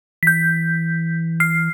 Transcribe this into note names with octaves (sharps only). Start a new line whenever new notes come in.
E3 G6 B6
F6 C7